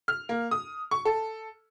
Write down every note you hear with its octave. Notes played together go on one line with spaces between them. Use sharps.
F6
A#3
D#6
C#6
A4